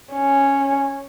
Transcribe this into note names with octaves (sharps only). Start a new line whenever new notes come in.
C#4